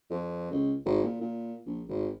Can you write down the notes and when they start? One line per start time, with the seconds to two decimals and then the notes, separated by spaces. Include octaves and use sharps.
0.11 F2
0.51 C#2
0.86 G#1
1.03 A#2
1.21 A#2
1.66 A#1
1.89 G#1